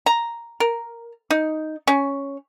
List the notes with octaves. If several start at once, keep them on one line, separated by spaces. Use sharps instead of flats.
A#5
A#4
D#4
C#4